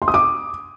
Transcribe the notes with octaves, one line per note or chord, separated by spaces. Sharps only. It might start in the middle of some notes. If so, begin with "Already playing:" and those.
C6
D#6
D6